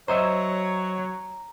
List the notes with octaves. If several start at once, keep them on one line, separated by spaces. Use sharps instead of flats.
F#3 C5 C#5 D#5 E5 A#5